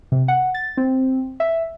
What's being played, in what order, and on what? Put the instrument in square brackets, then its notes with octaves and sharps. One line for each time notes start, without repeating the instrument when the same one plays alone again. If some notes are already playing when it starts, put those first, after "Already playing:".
[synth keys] C3
F#5
A6
C4
E5